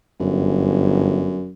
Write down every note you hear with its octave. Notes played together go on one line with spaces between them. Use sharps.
G1 F#2